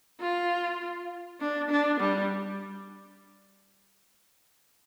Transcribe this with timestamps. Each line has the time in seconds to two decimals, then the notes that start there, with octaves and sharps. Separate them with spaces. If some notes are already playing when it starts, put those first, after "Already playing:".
0.20 F4
1.40 D4
1.70 D4
2.00 G3